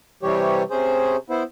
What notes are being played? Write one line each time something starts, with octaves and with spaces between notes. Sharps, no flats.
C3 E3 G3 G4 C#5
C3 C#4 G#4 C5
B3 E4 C5